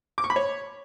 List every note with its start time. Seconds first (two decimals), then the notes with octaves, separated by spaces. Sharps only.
0.18 D6
0.24 C#6
0.30 B5
0.36 C#5